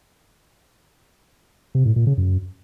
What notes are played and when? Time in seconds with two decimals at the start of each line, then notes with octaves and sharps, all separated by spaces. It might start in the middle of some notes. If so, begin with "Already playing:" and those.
1.75 C3
1.85 A2
1.96 A#2
2.07 C#3
2.17 F#2